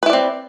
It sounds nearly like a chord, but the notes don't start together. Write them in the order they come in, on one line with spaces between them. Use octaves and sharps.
B4 E4 D5 C4